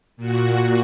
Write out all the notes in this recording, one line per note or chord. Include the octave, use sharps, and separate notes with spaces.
A#2 F#4